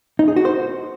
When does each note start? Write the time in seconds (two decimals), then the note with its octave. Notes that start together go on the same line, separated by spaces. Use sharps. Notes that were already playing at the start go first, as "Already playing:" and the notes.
0.19 D#4
0.28 G#4
0.36 F#4
0.45 C5